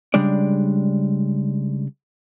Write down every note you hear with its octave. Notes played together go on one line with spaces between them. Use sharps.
C#3 G3 G#3 D4 D5